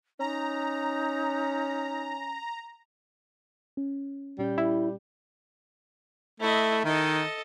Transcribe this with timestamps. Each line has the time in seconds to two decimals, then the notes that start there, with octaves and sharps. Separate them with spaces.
0.20 C#4 D#4 A#5
3.77 C#4
4.39 A#2 G3 C#4 G6
4.58 E4
6.40 A3 E4 D#5
6.85 D#3 A4 D#5